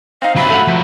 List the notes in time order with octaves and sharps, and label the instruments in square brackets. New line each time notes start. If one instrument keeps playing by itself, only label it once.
[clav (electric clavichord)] C4 D#4 [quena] F5
[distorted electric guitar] F#3 E5 [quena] B5
[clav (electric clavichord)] A3 F5 F#5
[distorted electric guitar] F3 F#3